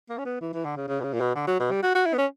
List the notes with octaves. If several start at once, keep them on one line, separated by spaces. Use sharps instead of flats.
A#3
C#4
B3
E3
E3
D3
C#3
C#3
B2
C#3
A#2
B2
D3
F#3
B2
G3
F#4
F#4
E4
B3
C#4